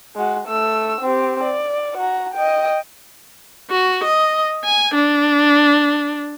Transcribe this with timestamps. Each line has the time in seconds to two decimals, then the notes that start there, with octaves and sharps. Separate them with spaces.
0.16 G#3 F#4
0.48 A3 E6
1.01 C4 G4
1.43 D5
1.97 F#4 A#5
2.34 D#5 G5
3.71 F#4
4.04 D#5
4.65 G#5
4.94 D4